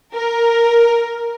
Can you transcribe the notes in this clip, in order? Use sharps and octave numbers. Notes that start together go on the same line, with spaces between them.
A#4